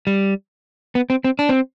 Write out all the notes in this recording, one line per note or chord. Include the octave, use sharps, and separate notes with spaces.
G3
B3
C4
C4
D4
C4